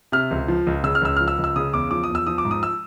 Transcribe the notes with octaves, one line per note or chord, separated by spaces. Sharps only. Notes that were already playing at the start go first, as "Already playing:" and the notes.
C3 F6
C#2
F3
C#2
C#3 E6
F6
C#2 E6
F3 F6
E6
C#2
E6
C#3 D#6
E2 D6
F3 D6
D#6
E2
E6
F3 D#6
D6
G#2
D#6
E6